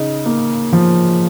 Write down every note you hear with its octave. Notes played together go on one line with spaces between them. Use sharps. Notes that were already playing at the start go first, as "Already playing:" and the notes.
Already playing: C#3 D#4
A#3
F3